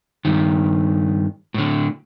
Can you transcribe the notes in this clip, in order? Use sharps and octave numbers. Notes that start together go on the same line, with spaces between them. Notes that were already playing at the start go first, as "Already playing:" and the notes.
G2 D#3
A2 D3